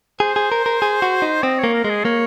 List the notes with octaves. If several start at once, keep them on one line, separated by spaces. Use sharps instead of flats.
G#4 C5
G#4
A#4
A#4
G#4
F#4
D#4
C4 D#5
C#5
A#3
A#4
G#3
G#4
A#3 C#5